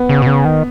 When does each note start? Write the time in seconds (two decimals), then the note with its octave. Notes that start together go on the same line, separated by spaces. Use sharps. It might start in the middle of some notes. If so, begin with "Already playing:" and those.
Already playing: B3
0.09 C#3
0.22 B2
0.27 C#3
0.45 D#3